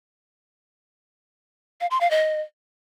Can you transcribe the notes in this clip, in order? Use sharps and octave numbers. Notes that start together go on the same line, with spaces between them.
F5
C6
F5
D#5